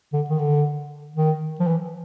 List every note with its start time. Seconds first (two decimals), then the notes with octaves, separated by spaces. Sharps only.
0.13 D3
0.30 D#3
0.39 D3
1.16 D#3
1.60 F3
1.67 E3